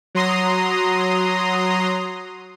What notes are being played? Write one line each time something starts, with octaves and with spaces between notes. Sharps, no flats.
F#3 A#5 C6 D#6